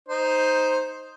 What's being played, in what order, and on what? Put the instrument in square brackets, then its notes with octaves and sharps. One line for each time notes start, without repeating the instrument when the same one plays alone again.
[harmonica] D#4 C5